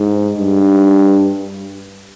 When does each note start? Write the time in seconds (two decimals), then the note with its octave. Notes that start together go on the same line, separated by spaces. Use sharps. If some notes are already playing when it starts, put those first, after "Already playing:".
Already playing: G#2
0.38 G2